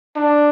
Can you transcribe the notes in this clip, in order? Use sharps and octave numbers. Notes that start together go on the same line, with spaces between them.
D4